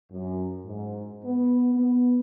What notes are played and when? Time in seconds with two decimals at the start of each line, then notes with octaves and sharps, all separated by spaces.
0.12 F#2
0.65 G#2
1.24 B3
1.75 B3